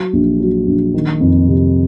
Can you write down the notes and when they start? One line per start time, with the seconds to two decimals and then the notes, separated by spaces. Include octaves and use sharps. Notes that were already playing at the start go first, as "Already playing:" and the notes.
Already playing: F#3
0.13 A#1
0.40 F#3
0.67 A#1
0.94 D#3
1.21 F2
1.48 C3